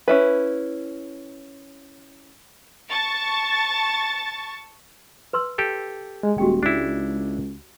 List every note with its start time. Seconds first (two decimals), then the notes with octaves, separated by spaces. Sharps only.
0.08 C#4 E4 B4
2.90 A5 C#6 A6
5.33 B4 C6 E6
5.58 G4 A4
6.23 G#3
6.38 D#1 F#4 G4 G5
6.63 C#2 D4 E4